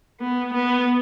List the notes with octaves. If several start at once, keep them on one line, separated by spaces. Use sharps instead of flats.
B3
B3